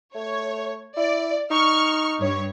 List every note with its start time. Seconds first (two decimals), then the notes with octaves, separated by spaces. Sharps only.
0.15 A3 C#5
0.97 E4 D5
1.50 D#4 C#6 F6
2.19 G2 C#5